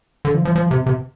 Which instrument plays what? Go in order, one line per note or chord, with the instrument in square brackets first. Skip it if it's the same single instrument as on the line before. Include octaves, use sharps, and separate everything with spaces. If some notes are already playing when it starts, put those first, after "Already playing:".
[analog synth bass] D3
F3
F3
F3
C3
C3